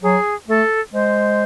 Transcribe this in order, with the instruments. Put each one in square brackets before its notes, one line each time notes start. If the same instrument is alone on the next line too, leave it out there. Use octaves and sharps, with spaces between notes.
[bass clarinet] F#3 [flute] G#4
[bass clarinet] A3 [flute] A4
[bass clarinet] G#3 [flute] C5